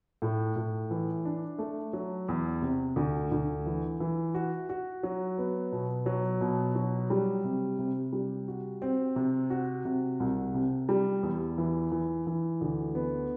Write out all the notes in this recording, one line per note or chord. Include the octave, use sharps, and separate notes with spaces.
A2
A2
E3
D4
A3
F#3
E2
C3
D2
D2
E3
E3
F#4
F#4
F#3
B3
B2
F#3
B2
F#3
G3
C3
C3
G3
F#4
C4
C3
F#4
C3
C2
C3
G3
E2
E3
E3
E3
D2
B3